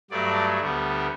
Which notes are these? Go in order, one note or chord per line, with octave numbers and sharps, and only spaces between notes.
G2 F#3 A3 D5
D2 D3 G3 B3